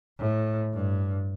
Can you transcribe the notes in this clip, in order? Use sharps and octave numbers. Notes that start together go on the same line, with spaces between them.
A2
G2